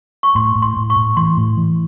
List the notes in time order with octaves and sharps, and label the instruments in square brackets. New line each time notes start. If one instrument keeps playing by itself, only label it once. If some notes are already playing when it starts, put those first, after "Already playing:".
[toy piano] C#6
[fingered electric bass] A2 [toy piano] C6
[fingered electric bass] A2
[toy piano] C6
[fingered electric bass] A2
[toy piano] C#6
[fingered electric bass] A2
[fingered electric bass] E3 [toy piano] C6
[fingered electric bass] A2
E3